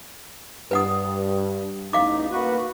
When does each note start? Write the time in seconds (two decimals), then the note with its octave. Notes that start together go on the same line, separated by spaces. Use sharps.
0.71 G2 B4 F#5 D#6
1.93 A1 E2 D#4 F5 D6
2.30 A#3 F#4 B4